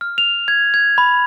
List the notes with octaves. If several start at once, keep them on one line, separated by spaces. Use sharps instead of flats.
F6
F7
G#6
G#6
B5